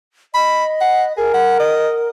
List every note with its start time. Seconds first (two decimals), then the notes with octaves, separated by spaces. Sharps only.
0.34 D#5 B5
0.81 F#5
1.17 G#4 A#4
1.34 F#5
1.60 D#5